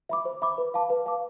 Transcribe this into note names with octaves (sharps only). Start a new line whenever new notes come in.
E5 B5 D6
C5
E5 B5 D6
B4
F5 A5 D6
B4
F5 A5 D6